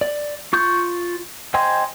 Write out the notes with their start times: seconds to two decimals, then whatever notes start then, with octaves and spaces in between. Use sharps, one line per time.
0.01 D5
0.53 F4 C#6 G6
1.54 C5 D#5 G5 G#5 C6